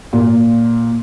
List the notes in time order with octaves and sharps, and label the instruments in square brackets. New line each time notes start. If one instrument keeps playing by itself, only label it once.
[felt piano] A#2